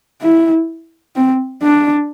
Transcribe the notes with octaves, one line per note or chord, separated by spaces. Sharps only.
E4
C4
D4